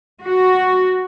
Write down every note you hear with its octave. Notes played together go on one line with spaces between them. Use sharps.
F#4